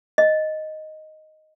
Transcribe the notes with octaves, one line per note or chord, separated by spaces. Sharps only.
D#5